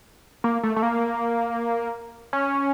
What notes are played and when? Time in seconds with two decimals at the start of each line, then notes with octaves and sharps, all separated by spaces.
0.44 A#3
0.63 A3
0.76 A3
0.83 A#3
2.33 C#4